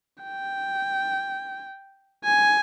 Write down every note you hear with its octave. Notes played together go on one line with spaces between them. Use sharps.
G5
G#5